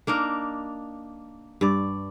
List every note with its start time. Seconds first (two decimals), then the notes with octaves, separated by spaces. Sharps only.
0.07 A#3 D4 D#4 A#4
1.61 G2 D5